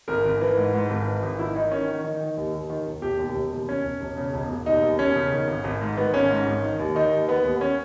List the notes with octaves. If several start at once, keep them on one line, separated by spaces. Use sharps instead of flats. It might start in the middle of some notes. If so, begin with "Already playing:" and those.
G#1 A#4
G#1
E3
G#2
G#2
G#1
E3
G#1
D#3 E4
D#3 D#4
D#3 C#4
D#3
D#3 D#4
D#3
D#2
D#2
D#3
E1
E1 G4
D#2
E1
D#2
E1 C#4
E1
E1
C#3
E1
E1
D#2 D#4
D#2
E1 C#4
C#3
D#3
G#1
G#1
G#2
D#3 B3
G#1 C#4
G#2
G#1
D#3
D#2
D#3 D#4
D#2
D#3 B3
D#2
C#4